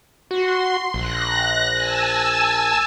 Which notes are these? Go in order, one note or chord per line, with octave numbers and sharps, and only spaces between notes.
F#4 C6
A#1 F#6 A#6
G#5 A5 E6